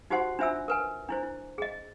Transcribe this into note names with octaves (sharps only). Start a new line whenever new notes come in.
D#4 F#4 G4 C5 F#5 C6
D4 F4 C5 E5 G#5 E6
A#4 B4 G#5
D4 E4 C5
E4
G#4 D#5